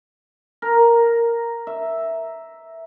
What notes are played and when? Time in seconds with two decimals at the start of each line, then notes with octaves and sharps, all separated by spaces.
0.62 A#4
1.67 E5